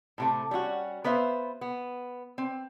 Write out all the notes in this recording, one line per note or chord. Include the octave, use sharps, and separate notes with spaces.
A2 C3 A3
G3 C#4 D#4 F#4
B3 B4 C5 E5 F5
B3
C4